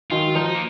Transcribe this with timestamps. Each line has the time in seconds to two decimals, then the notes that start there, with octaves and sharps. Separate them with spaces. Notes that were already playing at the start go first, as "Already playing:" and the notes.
0.11 D#3 F#3 F4
0.27 F#3
0.35 F3 D#4
0.54 A#3